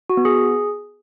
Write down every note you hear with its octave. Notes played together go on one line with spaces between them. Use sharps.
F#4
B3
G#4